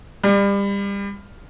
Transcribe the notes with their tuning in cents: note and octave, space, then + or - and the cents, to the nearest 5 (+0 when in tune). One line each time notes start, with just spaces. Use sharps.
G3 +30